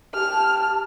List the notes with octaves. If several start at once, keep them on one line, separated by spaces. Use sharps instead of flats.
G4 A5 F6